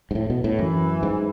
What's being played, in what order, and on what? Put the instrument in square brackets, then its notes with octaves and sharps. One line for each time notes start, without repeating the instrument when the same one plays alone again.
[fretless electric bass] G#2
A2
B2
A2
[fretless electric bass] F#2 [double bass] E3
[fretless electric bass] G#2